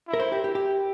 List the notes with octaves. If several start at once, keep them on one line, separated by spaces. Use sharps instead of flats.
E4
A#4
C5
G4
G4
G4